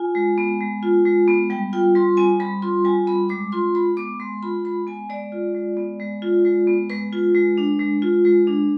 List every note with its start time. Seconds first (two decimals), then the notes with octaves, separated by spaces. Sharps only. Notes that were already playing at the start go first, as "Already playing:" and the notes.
Already playing: F4 G#5
0.15 G#3
0.38 B3
0.61 G#3
0.83 F4
1.05 G#3
1.28 B3
1.50 G3 G5
1.73 F4 G5
1.95 G3 C6
2.17 C4 G#5
2.40 G3 B5
2.62 F4 C6
2.85 G3 G#5
3.07 C4 B5
3.29 G#3 D6
3.52 F4 C6
3.75 G#3 B5
3.97 B3 D6
4.20 G#3 C6
4.43 F4 B5
4.65 G#3 B5
4.87 B3 G#5
5.10 G#3 D5
5.32 F4
5.55 G#3
5.77 B3
6.00 G#3
6.22 F4
6.45 G#3
6.67 B3
6.90 G#3 B4
7.13 F4
7.35 G#3
7.58 D4
7.79 G#3
8.02 F4
8.25 G#3
8.47 D4